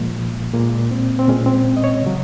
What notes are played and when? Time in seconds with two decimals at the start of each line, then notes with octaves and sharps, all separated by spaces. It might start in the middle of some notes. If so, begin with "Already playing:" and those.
Already playing: A#2 F3 G#3 A#3
0.54 A#2 G#3 A#3
0.91 C4
1.19 C4
1.28 A#2 G#3 C#4
1.46 C4
1.77 D#5
1.84 C#5
2.02 C#3 F#3